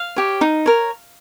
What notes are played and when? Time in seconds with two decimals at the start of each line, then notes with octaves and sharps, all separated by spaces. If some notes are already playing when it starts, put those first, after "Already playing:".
Already playing: F5
0.16 G4 C#5
0.41 D#4
0.66 A#4 C#5